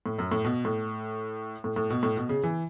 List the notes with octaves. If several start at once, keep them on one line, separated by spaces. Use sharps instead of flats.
A2
F#2
A2
B2
A2
A2
A2
B2
A2
B2
C#3
E3